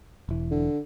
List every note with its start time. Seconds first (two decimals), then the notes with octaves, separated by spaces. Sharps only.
0.29 E1 E3
0.51 D3